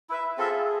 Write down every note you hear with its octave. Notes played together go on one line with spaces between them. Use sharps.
E4 B4 E5
C4 F4 G#4 A4 E5